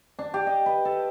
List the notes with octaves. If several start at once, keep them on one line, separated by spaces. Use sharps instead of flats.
D4
G4
D#5
B4
A4